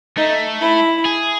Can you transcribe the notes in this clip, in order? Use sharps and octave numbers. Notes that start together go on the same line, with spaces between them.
A3 D#4
E4
G#4